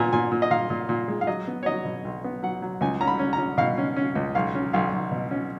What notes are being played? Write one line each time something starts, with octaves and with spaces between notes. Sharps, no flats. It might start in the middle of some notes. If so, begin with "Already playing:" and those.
Already playing: A#2 B3 G#5 A#5
A#2 G#5
A#2
D#5
A#2 F5
A#2
A#2
G#3
F5
F#3 D#5
B3
C#5
F#3 D#5
B2
B1
B3
F#3 F#5
F#3
C#2 G#5
C#4 A#5
B5
C#4
A#5
C#4
B2 F5
C#4
C#4
C#2
B1 F5
C#4
B1 F5
B1
B2
C#4